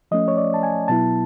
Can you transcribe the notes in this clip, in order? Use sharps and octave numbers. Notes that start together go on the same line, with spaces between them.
F3 A3 C#4 D#5
C#5
D5
A5
G#5
B2 F#3 B3 E4 A5